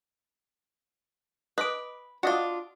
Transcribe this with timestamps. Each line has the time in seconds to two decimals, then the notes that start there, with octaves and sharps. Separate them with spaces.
1.58 B4 D#5 D6
2.23 D4 F4 F#4 D5 D#5